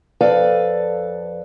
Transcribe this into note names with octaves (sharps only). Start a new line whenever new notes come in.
F2 A4 B4 D5 F5